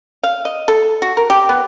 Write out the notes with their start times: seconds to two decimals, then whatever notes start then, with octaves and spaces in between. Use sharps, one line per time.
0.23 F5
0.45 D#5
0.68 A4
1.02 F#4
1.17 A#4
1.30 G4
1.49 B3